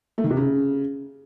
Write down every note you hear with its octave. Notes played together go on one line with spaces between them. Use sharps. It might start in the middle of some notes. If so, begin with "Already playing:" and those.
A3
D#3
C3
C#3